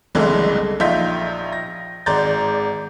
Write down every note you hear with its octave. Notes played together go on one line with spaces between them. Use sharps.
F#1 C2 D3 E3 G#3 A3
A#1 D#4 F4 E5 G6 B6
A#6
G#1 G#3 D5 A#5 G6 A6